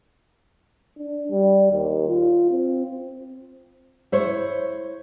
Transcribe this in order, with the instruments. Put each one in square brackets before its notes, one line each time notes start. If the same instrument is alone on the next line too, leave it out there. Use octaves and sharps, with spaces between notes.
[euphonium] D4
G3
D#2
F4
C4
[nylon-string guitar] E4 C5 C#5